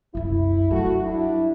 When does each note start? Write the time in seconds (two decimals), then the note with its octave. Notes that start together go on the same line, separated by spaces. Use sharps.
0.15 C2 F#2 E4
0.71 F#3 A3 F#4
1.03 G2 D4 E4